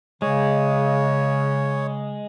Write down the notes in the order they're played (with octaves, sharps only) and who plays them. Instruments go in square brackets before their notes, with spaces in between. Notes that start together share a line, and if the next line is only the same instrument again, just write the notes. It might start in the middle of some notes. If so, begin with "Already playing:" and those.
[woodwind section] C#3 [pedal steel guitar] G#3 [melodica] C#5